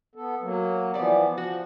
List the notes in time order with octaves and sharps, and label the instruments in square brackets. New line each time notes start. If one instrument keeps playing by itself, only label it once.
[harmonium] B3 A4
F#3 A#3
[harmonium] E3 F3 B3 [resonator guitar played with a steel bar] G3 D5
[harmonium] F3 [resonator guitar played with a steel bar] F#4